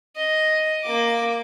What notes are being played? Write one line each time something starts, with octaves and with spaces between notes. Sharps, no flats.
D#5
A#3 D6